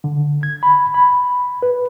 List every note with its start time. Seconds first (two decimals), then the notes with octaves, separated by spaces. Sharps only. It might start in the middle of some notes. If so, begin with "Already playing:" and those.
0.04 D3
0.43 G#6
0.63 B5
0.94 B5
1.62 B4